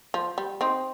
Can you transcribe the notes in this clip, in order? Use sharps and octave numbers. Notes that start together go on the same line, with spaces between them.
F3
G3
C4 D#4